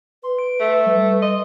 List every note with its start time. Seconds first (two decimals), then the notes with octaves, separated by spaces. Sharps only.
0.23 B4 C6
0.39 D7
0.60 A3
0.86 G3
1.22 D#5 C6